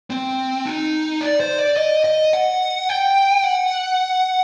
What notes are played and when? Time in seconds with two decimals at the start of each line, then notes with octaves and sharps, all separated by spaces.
0.10 C4
0.66 D#4
1.21 D5
1.40 C5
1.58 D5
1.77 D#5
2.04 D#5
2.33 F#5
2.89 G5
3.44 F#5